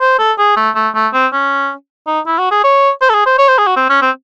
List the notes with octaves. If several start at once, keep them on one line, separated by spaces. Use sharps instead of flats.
C5
A4
G#4
A3
A3
A3
C4
C#4
D#4
E4
F#4
G#4
C#5
C5
A4
G#4
C5
C#5
C5
G#4
F#4
C4
C#4
C4